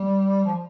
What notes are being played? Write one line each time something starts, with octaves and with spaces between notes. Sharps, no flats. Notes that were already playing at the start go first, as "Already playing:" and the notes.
Already playing: G3
F3